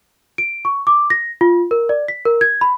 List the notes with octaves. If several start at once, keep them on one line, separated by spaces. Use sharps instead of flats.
D7
C#6
D6
A#6
F4
A#4
D5
B6
A#4
G#6
B5